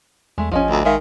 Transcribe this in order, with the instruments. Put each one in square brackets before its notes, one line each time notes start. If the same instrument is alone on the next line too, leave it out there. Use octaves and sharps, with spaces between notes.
[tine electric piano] E2 [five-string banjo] G#3 A3
[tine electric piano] A1 D#5 G#5 [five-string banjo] F3 C#4
[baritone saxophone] D2
[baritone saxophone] D#3 [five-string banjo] G#3 E5 F5